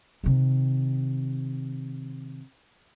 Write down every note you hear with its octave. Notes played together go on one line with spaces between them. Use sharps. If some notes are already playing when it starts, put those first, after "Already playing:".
C3 D#3